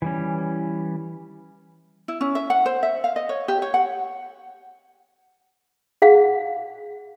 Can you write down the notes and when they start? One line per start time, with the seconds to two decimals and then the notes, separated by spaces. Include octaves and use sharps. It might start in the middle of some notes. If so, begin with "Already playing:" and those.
0.02 E3 G3 C#4
2.08 E4
2.21 C#4
2.35 E5
2.50 F#5
2.66 C5
2.83 E5
3.04 F5
3.16 D#5
3.29 C#5
3.48 G4
3.62 C#5
3.74 F#5
6.02 G#4 F5 F#5